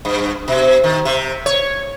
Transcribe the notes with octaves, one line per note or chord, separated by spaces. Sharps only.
G2
B2
D#3
C3
C#5